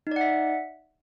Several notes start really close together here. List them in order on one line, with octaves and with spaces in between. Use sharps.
D#4 D5 F#5 E5